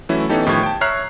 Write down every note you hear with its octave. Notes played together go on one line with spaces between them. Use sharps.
E3 F#3 A3 C#4 E4
E3 B3 C#4 D#4 G4 A4
A2 D#3 F3 G4 C#6 G#6
G5 A5
C#5 E5 A#5 F6 F#6 C7